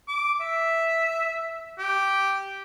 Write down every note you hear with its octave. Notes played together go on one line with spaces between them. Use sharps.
D6
E5
G4